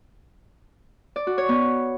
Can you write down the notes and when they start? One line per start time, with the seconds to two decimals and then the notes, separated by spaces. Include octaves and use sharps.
1.16 D5
1.27 F#4
1.38 C#5
1.49 B3